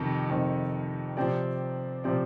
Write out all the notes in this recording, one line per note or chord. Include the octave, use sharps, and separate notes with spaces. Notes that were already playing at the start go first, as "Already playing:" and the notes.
Already playing: F2 C3 D#3
F2 C3 D#3
C3 F3 C4 G4 D5
C3 F3 C4 G4 D5